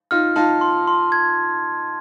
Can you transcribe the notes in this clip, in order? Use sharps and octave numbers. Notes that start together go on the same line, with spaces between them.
D#4 F4 F6
D#4 F4 A5
C6
C6
G#6